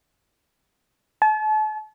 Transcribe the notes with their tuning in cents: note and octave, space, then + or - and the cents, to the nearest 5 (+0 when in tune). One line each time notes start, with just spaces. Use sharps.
A5 -40